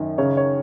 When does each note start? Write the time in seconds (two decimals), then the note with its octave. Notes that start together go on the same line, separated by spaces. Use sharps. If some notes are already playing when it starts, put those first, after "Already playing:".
Already playing: F#2 D#3
0.18 C#3 C#5
0.37 C#5